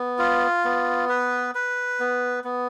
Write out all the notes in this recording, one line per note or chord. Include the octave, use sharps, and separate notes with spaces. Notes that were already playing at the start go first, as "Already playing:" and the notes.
Already playing: B3
F4
B3
B4
B4
B3
B3